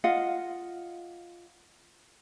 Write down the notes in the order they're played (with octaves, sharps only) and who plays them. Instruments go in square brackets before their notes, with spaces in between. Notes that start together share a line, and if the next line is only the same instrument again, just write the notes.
[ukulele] F4 D#5 F5 F#5